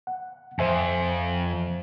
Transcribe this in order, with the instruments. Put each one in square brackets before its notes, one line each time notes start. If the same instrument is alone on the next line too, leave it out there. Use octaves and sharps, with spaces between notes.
[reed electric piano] F#5
[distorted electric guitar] F2 [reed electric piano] C5 E5 G#5